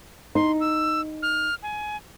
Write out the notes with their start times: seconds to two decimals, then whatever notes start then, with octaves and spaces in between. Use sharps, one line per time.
0.35 D#4 C6
0.61 E6
1.22 F6
1.63 G#5